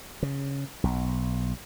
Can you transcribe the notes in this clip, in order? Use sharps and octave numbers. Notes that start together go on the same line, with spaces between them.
C#3
B1